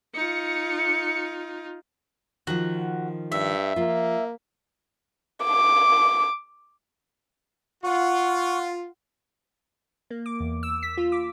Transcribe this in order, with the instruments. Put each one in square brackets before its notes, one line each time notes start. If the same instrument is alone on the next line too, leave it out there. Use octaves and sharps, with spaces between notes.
[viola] D#4 F4 [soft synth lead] C#7
[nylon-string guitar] D#3 F3 [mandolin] F#4
[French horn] G2 [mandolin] E5
[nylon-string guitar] F3 F4 [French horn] A#3
[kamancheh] D6
[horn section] F4 [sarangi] F#5 [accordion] C#6
[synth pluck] A#3
D6
E2
E6
B6
F4
D6